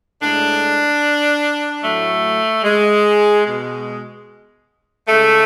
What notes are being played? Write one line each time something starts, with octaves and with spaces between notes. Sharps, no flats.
A2 G#3 D4
A2 F#3 A3
G#3
B2 G#3
C#3 G#3 A3